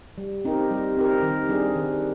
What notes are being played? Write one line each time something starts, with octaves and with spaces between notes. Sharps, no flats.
G3
C4 D#4 G4 A#4
G3
C4 D#4 G4 A#4
D#3
G3 D4 G#4
D#3